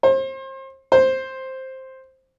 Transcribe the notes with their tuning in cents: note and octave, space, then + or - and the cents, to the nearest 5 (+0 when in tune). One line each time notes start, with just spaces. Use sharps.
C5 +35
C5 +5